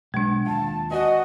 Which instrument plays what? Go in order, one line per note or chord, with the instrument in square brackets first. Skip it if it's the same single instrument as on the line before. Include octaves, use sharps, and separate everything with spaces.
[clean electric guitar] B1 [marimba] G#3 D4
[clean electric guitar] D#2 F4 [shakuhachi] A5
[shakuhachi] F#4 [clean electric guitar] B4 D5 G#5 [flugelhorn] D#5